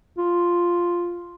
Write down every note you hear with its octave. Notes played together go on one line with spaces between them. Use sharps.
F4